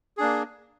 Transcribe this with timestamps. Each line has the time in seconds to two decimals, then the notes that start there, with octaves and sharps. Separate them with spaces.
0.17 G#4
0.20 D4
0.22 A#3